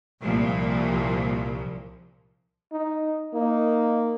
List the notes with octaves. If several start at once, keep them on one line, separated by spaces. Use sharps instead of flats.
C2 A#2 F3
D#4
A#3 D#4